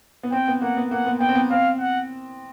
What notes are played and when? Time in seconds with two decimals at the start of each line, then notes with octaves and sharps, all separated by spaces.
0.23 B3
0.32 C4 G5
0.48 B3
0.61 A#3 F#5
0.77 B3
0.91 A#3 F#5
1.06 B3
1.20 B3 G5
1.29 C4
1.35 B3
1.51 C4 F5
1.80 F#5